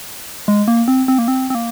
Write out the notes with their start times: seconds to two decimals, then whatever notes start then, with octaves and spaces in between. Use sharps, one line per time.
0.48 G#3
0.68 A#3
0.88 C4
1.08 C4
1.18 A#3
1.28 C4
1.50 C4
1.55 A#3